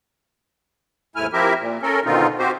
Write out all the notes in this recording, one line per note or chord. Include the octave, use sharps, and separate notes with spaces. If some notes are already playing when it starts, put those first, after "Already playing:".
D#2 G#2 A3 E4 G#5 F6
F3 C4 E4 G4 A#4 E5
A#2
C#4 A4 A#4
B2 D3 D#3 C4 D#4 F4
C4 F#4 G4 C5